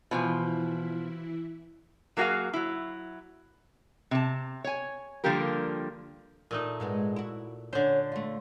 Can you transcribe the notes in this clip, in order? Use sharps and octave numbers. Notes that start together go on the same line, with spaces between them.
B2 E3 F3 E4 G#5
F#3 A#3 E4 F#4 G#4 F5
F#3 E4
C3 A5
C#5 G#5
D3 F3 G3 A#3 G4 A#4
A#2 A3 D#4
G#2 G#3 B3
E4 F#4
D3 C#4 C5 C#5
A3 F4